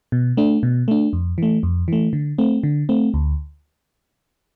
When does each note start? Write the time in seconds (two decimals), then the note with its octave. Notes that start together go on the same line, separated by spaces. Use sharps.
0.12 B2
0.37 A3 D4
0.63 B2
0.88 A3 D4
1.13 F2
1.38 E3 A3
1.63 F2
1.88 E3 A3
2.13 D3
2.38 A3 C4
2.63 D3
2.89 A3 C4
3.14 D2